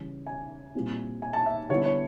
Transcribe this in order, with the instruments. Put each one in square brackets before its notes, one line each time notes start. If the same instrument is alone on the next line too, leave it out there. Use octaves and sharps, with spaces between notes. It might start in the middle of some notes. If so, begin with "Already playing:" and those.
Already playing: [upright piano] C#3 E3 G3
G#5
A#2 G3 C4 E4
G#5
A5
E5
D3 G3 B3 E4 C#5
C#5